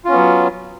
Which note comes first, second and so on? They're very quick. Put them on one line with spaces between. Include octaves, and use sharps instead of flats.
F4 C#4 B3 F#3